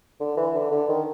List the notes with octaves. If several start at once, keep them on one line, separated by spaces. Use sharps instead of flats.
D3
E3
D3
D3
D#3